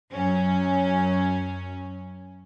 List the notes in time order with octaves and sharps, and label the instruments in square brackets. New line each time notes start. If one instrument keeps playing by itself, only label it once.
[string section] F#2 C#4